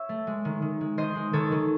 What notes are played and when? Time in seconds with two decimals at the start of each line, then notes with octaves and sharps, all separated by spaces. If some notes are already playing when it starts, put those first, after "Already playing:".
Already playing: C#5 E5
0.09 A3
0.27 G#3
0.45 D#3
0.62 D#3
0.81 G#3
0.98 D#3 C5 D#5
1.15 G#3
1.33 D#3 A4 C#5
1.52 D#3